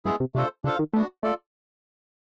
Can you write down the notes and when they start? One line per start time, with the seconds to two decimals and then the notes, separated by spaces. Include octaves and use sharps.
0.05 G2 G#3 B3 E4 G#4
0.20 C3
0.35 C3 A3 D4 F4 A4 C5
0.64 C#3 D4 F4 A4 C5 F5
0.79 D#3
0.93 A3 B3 D4 F#4
1.23 A3 F4 A4 D5